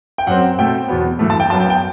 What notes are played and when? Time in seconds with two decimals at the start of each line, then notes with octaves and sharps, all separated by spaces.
0.18 G5
0.27 F#2 F#3 C4 F#5
0.59 B2 A3 C4 G5
0.88 E2 B2 F#3 B3
1.19 G2 E3 A3
1.30 A5
1.40 G5
1.50 F#2 F#3 B3 A5
1.60 G5
1.70 G5